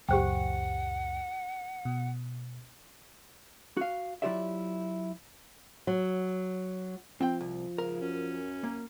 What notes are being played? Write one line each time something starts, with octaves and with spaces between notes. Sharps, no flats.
C#2 F#2 A#2 G4 C5 F#5 G5
B2
F#4 F5
F#3 E4 F4 G4 D5 E5
F#3
F3 C4 G5
C2
G#2 C#3 A#4
F#2 C#4
A#3